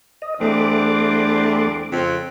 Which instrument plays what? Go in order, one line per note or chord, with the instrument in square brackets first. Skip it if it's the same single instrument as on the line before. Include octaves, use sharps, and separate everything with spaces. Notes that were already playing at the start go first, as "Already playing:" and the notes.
[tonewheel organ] D#5
[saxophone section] E2 C4 D4 [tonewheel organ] A3 D6
[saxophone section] F2 C#3 C4